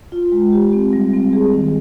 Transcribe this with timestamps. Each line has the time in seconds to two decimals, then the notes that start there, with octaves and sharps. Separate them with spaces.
0.12 F4
0.32 G#3
0.53 G4
0.73 C4
0.93 G3
1.13 C4
1.33 G#4
1.54 D#3